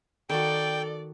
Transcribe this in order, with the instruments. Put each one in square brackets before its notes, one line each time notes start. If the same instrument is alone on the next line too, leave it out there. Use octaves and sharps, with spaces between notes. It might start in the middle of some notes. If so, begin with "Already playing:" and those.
[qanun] D#3 F#4 [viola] A4 [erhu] D5 [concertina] G5